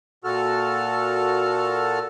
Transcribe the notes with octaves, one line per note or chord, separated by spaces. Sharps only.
A#2 F#4 A4 F6